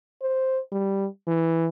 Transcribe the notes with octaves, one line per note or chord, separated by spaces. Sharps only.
C5
G3
E3